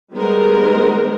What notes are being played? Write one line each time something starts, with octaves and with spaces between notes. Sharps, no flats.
D#3 G3 G#3 B3 A#4 C5